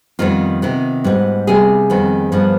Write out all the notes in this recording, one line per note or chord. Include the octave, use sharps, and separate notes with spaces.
F2 D#3 G3 B3 F4
C3 D#3 B3
G#2 G3 B3
C3 G3 B3 G#4
F2 D#3 G3 B3
G2 F3 B3